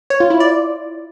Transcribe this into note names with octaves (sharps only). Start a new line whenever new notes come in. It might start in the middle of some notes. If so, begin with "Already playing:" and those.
C#5
F4
E4
D5